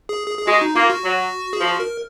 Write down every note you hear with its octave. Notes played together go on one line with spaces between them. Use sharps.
G#4
G#4
G#4
G#3 F#4
D#4
A#3 F4
F#4
F#3
G#4
F3 F#4
A#4